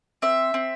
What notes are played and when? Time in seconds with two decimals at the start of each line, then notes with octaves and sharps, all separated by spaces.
0.22 C4 E5
0.54 C4